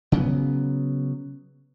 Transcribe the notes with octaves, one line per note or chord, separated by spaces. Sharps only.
C#3 F#3 B3